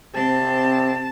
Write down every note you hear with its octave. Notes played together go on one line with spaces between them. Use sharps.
C3 C4 A5